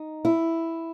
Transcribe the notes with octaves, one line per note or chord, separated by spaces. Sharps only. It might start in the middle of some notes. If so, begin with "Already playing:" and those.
Already playing: D#4
E4